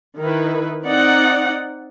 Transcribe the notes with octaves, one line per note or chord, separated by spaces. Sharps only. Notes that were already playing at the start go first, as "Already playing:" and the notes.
D#3 E4 B4
C4 D#4 D5 F#5